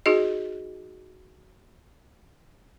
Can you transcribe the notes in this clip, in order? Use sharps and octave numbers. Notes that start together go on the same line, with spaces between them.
D#4 F#4 G#4 D#5